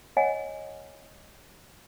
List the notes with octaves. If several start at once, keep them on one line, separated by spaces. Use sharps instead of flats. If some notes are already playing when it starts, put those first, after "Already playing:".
C#5 D#5 F#5 G#5